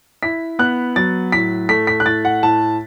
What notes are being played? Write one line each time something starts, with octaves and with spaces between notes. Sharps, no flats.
E4 B6
B3 F#6
F#3 A6
A2 B6
A3 B6
B6
F#6
A2 A6
F#5
A2 A5